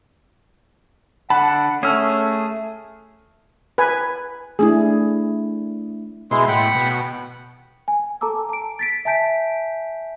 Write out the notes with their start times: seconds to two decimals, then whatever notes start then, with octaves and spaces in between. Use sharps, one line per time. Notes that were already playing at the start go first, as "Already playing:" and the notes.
1.30 D3 F#5 A5 B5
1.83 A3 C#4 G#4 E6 F6
3.78 B4 G#5
4.59 A3 D4 E4 G#4
6.31 B2 G#3 E4 C6
6.48 A2 F#5 G5 B5
6.75 B2
7.88 G#5
8.21 A4 A5 A#5 D6 E6
8.49 A5 D7
8.79 A6 B6 D7
9.05 E5 G#5 A5 G6 B6 D7